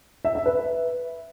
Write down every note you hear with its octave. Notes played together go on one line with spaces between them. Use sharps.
E5
E5
B4